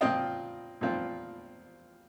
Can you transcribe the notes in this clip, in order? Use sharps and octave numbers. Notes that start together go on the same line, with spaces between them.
A#2 F3 C4 F4 D#5 G5
A#2 F3 C4 F4